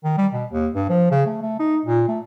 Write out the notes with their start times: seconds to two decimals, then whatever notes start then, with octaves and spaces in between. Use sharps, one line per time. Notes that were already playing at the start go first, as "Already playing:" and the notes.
0.04 D#3
0.17 G3
0.33 B2
0.51 D#2
0.75 G2
0.89 F3
1.11 C#3
1.26 A3
1.42 A3
1.60 D#4
1.85 A#2
2.09 A3